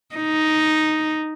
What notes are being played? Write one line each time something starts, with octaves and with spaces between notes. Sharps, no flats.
D#4